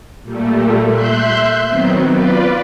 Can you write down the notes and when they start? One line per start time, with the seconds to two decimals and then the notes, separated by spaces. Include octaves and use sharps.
0.23 A#2 G3 A3
0.88 E5 C6 F#6 G6
1.67 D#3 F#3 B3 C4
2.09 F4 B4 D5